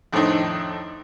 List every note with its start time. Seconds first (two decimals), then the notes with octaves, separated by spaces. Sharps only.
0.13 F2 A2 D#3 C4 D4 D#4